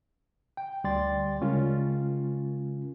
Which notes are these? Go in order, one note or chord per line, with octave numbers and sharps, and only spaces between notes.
G5
D2 G3 D5 G5 C6 A6
C#3 G#3 C#4 F4 A#4